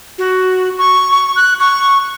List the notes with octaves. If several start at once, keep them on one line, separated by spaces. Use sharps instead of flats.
F#4
C#6
C#6
F#6
C#6